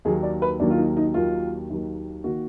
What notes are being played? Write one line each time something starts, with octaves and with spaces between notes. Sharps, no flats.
D#2 D#3 F#3 A#3 G#4
D5
B4
D#2 D#3 F#3 A#3 D4
F4
D#4
D#4
D#2 D#3 F#3 A#3 F4
D#2 D#3 F#3 A#3
D#3 A#3 F#4